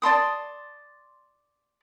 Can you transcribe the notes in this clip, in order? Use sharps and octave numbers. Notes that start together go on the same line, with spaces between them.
D5 A5 C6 D#6